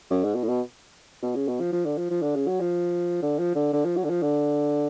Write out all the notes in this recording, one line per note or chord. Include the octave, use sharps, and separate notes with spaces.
F#2
G#2
B2
A2
B2
B2
C#3
B2
F3
F3
D3
F3
F3
D3
C#3
F#3
F3
D3
F3
D3
D3
F3
F#3
D3
F3
D3